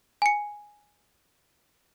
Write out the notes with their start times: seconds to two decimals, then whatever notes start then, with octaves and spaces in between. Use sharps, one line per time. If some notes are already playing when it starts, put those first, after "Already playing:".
0.22 G#5 C#7